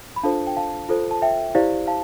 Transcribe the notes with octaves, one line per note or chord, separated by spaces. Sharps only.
B5
D4 F4 A4 C5 F5 A5
G5
F5 A5
F4 A4 C5
A5
E5 G5
E4 G4 C5 D5 F5
F5 A5